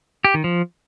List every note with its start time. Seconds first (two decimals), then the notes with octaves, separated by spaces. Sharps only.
0.25 G4
0.34 D#3
0.44 F3